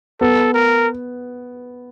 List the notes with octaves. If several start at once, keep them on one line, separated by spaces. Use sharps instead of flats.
B3 A4
A#4